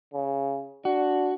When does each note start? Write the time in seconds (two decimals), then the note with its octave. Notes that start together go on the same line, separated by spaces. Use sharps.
0.14 C#3
0.85 D4 F#4